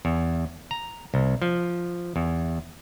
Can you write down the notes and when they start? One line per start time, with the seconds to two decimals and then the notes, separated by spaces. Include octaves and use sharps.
0.05 E2
0.71 A#5
1.14 C2
1.42 F3
2.16 E2